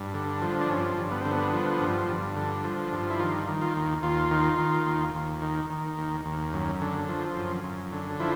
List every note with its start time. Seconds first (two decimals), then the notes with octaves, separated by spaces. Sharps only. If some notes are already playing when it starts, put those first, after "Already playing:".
Already playing: G2
0.14 D3
0.42 F3
0.61 D4
0.69 G2 C#4
0.97 G2
1.11 B3
1.21 D3 C4
1.31 B3
1.53 F3
1.81 G2
2.08 G2
2.36 D3
2.64 F3
2.92 G2
3.10 E4
3.19 D#3 F4
3.48 D#3
3.62 F4
3.76 D#2
4.03 D#2 F4
4.31 D#3
4.58 D#3
4.87 D#2
5.14 D#2
5.42 D#3
5.70 D#3
5.97 D#2
6.25 D#2
6.53 F#2
6.81 D3
7.09 F3
7.37 F#2
7.64 F#2
7.92 D3
8.20 F3 E4